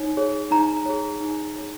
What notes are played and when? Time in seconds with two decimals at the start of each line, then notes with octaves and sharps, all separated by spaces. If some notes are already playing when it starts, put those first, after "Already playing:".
Already playing: D#4 C#5
0.17 G#4 C#5
0.51 D#4 A#5
0.86 G#4 C#5
1.20 D#4
1.56 G#4 C#5